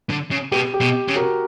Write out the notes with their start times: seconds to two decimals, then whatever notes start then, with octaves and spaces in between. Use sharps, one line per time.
0.10 D3
0.31 C#3
0.52 B2 G4
0.74 G4
0.80 B2
1.08 C#3
1.15 F#4 A#4